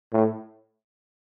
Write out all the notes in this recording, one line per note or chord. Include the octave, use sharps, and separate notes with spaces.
A2